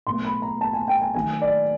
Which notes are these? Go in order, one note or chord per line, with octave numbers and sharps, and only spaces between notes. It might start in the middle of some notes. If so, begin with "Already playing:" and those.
B2 F#3 A3 C6
B5
A#5
A5
G#5
G5
G#5
D#3 F#3 A3 G#5
D5